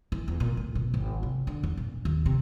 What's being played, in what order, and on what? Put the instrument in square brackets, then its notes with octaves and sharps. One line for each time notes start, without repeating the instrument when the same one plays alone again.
[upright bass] E3
E2
A#2
A2
B2
G#1
C3
D3
E2
A#2
D#2
C3